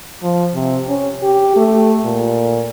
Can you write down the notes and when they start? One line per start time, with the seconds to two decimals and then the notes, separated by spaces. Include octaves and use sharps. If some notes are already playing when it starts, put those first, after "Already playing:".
0.23 F3
0.54 C3
0.88 C#4
1.23 G4
1.56 A3
2.05 A#2